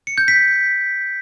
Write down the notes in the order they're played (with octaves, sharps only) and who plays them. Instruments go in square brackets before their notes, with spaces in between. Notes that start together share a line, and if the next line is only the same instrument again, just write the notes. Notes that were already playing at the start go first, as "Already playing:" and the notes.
[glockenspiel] C#7
G6
B6